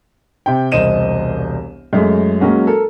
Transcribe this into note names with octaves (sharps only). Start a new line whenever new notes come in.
C3 G5
E1 C2 C5 D#5 D#7 E7
F#2 G#3 A3
F#3 G#3 A#3 C#4 F#4
A4 A#4